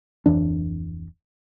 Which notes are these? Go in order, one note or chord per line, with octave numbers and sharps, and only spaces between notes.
D1 F2 E3 D4